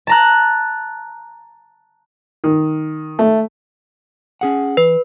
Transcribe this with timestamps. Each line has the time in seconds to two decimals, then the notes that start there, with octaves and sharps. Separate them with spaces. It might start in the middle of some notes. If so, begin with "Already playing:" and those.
0.07 A5 A#5 F#6
2.44 D#3
3.19 A3
4.41 C#4 G#4 F#5
4.77 E3 B4